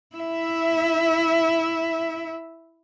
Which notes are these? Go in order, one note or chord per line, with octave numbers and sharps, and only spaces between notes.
E4 E5